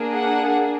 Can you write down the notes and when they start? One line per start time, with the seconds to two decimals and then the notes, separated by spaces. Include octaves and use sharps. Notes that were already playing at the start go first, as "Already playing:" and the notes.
Already playing: A#3 D4 G#4
0.15 F#5